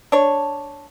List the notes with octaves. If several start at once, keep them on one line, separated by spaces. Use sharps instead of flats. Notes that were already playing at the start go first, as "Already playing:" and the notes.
D4 C#5